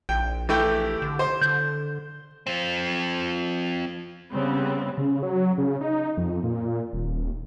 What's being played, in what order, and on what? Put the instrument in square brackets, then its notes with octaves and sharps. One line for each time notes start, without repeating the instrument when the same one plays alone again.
[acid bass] A#1 [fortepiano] G5
[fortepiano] E3 A3 G5 [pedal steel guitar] G4
[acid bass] D3
[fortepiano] C5
[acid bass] D3 [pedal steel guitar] G6
[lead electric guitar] F3 C4
[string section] C#3 G3 B3 C4
[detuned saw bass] C#3
F#3
C#3
D#4
F2
A#2
D#1